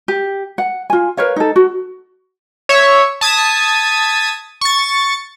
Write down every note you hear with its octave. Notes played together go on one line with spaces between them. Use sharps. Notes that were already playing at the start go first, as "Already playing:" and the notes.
G4
F#5
F4 G#5
A#4 B4 C#5 F5
D#4 A4
F#4
C#5 E5
A5 D#6 G#6 B6
C#6 A6